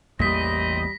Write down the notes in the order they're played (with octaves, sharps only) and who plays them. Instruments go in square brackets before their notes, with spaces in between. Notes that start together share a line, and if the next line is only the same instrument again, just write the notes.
[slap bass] A1 E2 A#3 [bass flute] G3 [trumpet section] C4 D#5 [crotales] A#6 B6